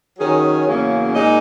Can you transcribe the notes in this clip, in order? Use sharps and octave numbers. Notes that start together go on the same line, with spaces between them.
D#3 F#3 C#4 G#4
E2 C#3 F#3 A#3 C#4
A#2 G#3 D#4 G#4 D#5